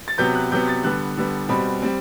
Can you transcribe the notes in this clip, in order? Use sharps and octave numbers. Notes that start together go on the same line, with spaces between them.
A6
C3 F#3 B3 G6
F#6
C3 F#3 B3 G6
A6
D3 G3 B3 F#6
D3 G3 B3
B2 G3 C4 B5
G3 C4